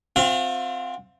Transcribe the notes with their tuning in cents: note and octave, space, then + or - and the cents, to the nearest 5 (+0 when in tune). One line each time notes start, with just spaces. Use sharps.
C4 +0 F4 +45 F5 -45